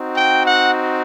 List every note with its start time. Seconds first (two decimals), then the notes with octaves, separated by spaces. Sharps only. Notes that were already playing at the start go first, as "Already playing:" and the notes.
Already playing: C4 D#4 F#4
0.16 G5
0.45 F#5